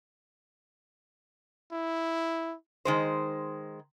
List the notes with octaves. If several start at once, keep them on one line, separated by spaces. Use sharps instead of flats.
E4
D#3 G#3 C5